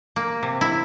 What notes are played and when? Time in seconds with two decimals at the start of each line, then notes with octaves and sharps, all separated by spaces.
0.16 A#3
0.43 C3
0.61 E4